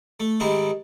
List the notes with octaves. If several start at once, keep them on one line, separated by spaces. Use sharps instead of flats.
A3
G#2 D#3 G3 C4 D#4 E4